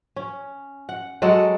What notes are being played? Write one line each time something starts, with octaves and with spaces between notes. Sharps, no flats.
C#4
F#5
F#3 G#3 A4 F#5